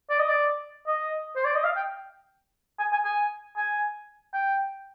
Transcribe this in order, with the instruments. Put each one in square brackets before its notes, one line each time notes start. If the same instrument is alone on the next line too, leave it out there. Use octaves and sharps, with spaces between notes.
[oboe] D5
D#5
D5
D#5
C5
D5
D#5
F5
G5
G#5
G#5
G#5
G#5
G5